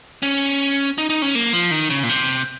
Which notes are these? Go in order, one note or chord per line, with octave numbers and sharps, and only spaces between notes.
C#4
D#4
D#4
C#4
A#3
F3
D#3
C#3
A#2
C3